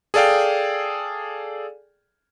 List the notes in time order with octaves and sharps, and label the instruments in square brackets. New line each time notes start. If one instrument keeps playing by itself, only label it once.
[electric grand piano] G#4 A4 D5 F5 G5